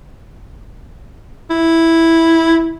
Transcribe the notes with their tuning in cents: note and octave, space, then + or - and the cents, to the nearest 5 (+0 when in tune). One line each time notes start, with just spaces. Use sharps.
E4 -5